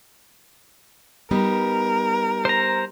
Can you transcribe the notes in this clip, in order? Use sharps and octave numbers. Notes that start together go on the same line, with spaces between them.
G3 B3 D#4 A#4
C5 A#5